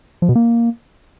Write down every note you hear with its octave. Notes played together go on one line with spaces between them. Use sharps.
F3
B2
A#3